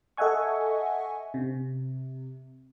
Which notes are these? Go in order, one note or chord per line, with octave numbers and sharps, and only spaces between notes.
A4 D#5 E5 F#5 G#5 C#6
C3